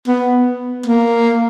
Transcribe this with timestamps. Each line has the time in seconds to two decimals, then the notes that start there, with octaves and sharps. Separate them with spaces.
0.07 B3
0.86 A#3